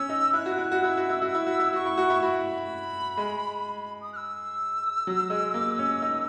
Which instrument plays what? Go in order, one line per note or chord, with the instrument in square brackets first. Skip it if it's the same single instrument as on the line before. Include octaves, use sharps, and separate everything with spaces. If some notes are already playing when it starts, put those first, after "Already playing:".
Already playing: [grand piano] C#4 [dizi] E6
[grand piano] D#4
[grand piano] E4 [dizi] F#6
[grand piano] F#4
E4
F#4
[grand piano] E4 [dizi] E6
[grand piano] F#4
E4
F#4
[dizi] E6
[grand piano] E4
F#4
E4
[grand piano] F#4 [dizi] C#6
[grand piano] E4
F#4
E4
[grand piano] F#4 [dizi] B5
[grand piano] G#3
[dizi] D#6
F#6
E6
[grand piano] F#3
G#3
A#3
C#4
D#4